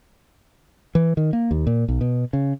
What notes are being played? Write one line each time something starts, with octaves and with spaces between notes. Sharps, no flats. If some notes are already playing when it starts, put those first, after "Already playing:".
E3
D#3
A#3
D#2
A#2
B1
B2
C#3